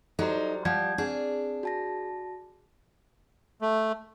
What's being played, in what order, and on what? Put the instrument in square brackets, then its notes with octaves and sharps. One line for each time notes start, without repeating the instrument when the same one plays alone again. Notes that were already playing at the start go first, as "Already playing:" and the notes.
[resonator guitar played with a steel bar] F#3 G3 C5 [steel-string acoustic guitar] D#4 [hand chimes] A4
[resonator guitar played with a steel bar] F3 [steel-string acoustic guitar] G3 [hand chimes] F#5 G6 G#6
[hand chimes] C4 [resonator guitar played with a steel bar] D4 [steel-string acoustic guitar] G#4
[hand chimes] F#4 A5 A#6
[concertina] A3